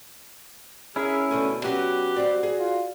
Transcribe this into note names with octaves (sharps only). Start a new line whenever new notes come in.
C#4 E4 G#4 A#4
D2 B2 A3 G#5
F#3 B3 C#4 F#4 G4
G3 C4 D5
G#4
F4